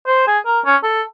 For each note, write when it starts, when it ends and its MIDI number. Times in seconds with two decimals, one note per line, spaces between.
0.07 0.23 72
0.27 0.39 68
0.46 0.60 70
0.65 0.76 61
0.83 1.02 69